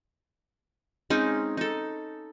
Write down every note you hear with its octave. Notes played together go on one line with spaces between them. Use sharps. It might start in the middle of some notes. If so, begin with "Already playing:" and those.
G#3 C4 C#4 D#4
D#4 A4